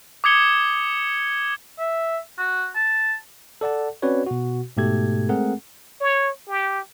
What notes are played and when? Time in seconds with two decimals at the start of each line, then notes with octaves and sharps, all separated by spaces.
0.24 D6 D#6 G#6 C#7 G7
1.79 E5
2.38 F#4
2.75 A5
3.61 A4 D5 F#5 A5
4.02 C4 C#4 F#4 B4 C#5 D5
4.27 B2 F#4
4.77 G#2 B2 A3 G4 A4 G#6
5.29 G#3 A3 C4 G#4 A#4 F#5
6.00 C#5
6.48 G4